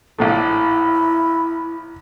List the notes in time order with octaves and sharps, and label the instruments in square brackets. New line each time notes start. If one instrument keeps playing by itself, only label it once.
[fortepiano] A#1 A2 A3 [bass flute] E4